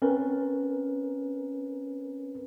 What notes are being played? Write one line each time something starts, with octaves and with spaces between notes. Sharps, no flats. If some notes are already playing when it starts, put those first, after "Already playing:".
C4 C#4 A#4 B4